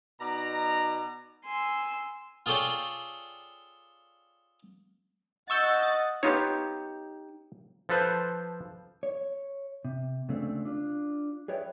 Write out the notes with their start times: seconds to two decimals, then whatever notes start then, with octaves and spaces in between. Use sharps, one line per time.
0.21 B2 D#4 D5 A#5
1.45 G#5 C6 E6
2.46 F4 G#4 A4 C#5 D5 G5
5.50 D#5 F#5 C#6 E6 G6 A6
6.23 B3 D#4 F4 G4 C#5
7.89 F3 A4 B4 C5
9.03 C#5
9.85 C3
10.29 D2 C#3 G#3 A3 C4 D4
10.65 D4 F4
11.48 G#4 B4 C#5 D5 E5 G5